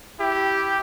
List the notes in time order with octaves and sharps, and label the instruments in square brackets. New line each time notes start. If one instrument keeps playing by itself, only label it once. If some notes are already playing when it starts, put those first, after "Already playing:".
[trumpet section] E4 G4